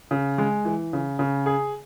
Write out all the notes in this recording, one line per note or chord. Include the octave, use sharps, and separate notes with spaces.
C#3
G#3
E3
C#3
C#3
G#4